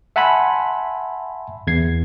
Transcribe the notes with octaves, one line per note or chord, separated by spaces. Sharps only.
E5 F#5 G#5 A5 B5 C6
E2 G#6 C7